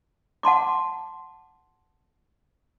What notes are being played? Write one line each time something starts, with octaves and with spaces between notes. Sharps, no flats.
F#5 A5 C6 D6